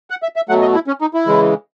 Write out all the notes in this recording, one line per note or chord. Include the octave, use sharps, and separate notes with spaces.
F#5
E5
E5
B2 F#3 A3 F#5
D#5
E4
C#4
D#4
E4
C#3 E3 G#3